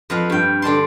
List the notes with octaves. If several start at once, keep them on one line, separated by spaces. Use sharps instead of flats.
F2 B4 F5
G2 G5
D3 D5 A5 C6